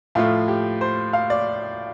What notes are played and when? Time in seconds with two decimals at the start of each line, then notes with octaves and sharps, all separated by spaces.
0.15 A2 F3 A3 F4
0.48 G4
0.81 C5
1.13 F5
1.30 D5